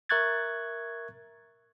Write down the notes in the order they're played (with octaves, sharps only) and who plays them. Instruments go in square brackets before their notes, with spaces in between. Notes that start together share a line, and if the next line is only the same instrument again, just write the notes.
[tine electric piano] A#4 E5 C#6 F#6 G#6 A6